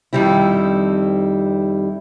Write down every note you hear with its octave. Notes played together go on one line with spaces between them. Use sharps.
F2 D#3 G3 C4 E4